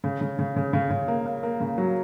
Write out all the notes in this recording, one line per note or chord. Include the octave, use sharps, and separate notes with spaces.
C#3
C#3
C#3
C#3
C#3
C#3
A#3
A#3
A#3
C#3
F#3